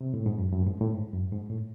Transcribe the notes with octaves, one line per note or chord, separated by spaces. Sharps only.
C3
A2
G#2
F#2
F#2
G#2
A2
G#2
F#2
G#2
A2